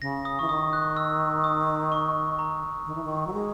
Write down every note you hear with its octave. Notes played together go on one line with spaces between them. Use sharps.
C#3 A#6
D#6
E3 C#6
D#3 D#6
F#6
E6
D#6
C#6
A#5
D#3
E3
D#3
F#3
G#3